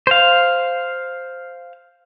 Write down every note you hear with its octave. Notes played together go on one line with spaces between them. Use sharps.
C5 F5